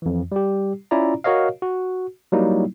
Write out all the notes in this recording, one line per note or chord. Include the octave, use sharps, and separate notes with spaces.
F2 E3
G3 G4
C#4 E4 F4 D5 A#5
F#4 A#4 C#5 D#5 F5
F#4
F#3 G3 A#3 D#4 E4